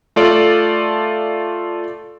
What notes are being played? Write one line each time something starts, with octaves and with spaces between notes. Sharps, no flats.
A3 F4 A4 D5